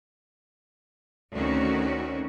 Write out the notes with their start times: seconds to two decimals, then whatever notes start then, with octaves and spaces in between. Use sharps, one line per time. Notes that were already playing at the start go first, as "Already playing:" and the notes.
1.33 D2 D#3 C4 C#4 F#4